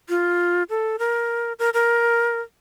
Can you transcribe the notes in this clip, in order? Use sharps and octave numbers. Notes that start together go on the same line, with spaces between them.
F4
A4
A#4
A#4
A#4